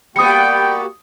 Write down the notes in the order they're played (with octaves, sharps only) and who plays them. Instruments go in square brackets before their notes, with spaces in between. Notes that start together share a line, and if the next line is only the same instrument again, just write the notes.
[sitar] G3 B3 [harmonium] A#3 F#4 G4 [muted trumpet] G5 [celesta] D#6 C#7